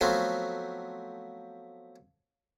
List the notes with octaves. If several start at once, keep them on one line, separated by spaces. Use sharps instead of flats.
F3 F#3 A3 B3 C4 C6